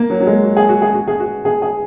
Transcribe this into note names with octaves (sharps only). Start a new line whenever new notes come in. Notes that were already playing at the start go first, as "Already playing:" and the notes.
Already playing: A#3
F#3
F#3
G#3
F#4
G#4
F#4
G#4
F#4
G#4
F#4
G#4
G#4